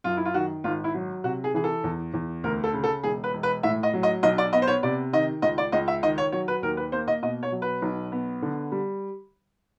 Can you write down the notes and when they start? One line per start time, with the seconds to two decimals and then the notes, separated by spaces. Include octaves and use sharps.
0.04 F#2 F4
0.17 E4
0.25 F4
0.34 D#3 F#4
0.64 G#1 F4
0.84 E4
0.94 F#3
1.24 C3 F#4
1.44 G#4
1.54 E3 G#4
1.64 A4
1.84 E2
2.14 E2
2.44 D2 A#4
2.64 A4
2.74 C#3
2.84 A4
3.04 E1 G#4
3.24 B4
3.34 E1
3.43 B4
3.63 A2 E5
3.83 D#5
3.93 F#3
4.03 D#5
4.23 B1 D#5
4.38 D5
4.53 B3 D#5
4.62 C5
4.68 C#5
4.83 C3 D5
5.13 D#3 D#5
5.42 C#2 D#5
5.58 D5
5.72 C#2 D#5
5.88 E5
6.03 D#3 D#5
6.18 C#5
6.32 F#3 C#5
6.48 B4
6.62 D#2 A#4
6.77 B4
6.92 A#3 C5
7.08 D#5
7.22 B2 D#5
7.43 C#5
7.52 F#3
7.62 B4
7.82 B1
8.12 B3
8.42 D3
8.72 G3